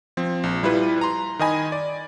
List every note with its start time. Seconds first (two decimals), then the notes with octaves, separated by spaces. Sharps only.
0.17 F3 C4
0.43 A#1
0.63 G3 E4 F4 B4
1.01 A#5 C6
1.39 D#3 D#5 G#5 B5
1.72 D5